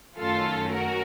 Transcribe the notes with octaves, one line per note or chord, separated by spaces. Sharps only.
F#2 D#3 A3 C#4 F4 A4
F#4 A#4